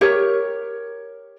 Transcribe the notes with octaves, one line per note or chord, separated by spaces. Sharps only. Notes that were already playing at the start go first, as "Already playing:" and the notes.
G4 A#4 C#5